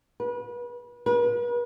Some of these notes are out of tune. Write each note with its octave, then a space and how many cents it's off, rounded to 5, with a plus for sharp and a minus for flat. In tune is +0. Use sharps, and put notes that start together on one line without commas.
B4 -30
B4 -40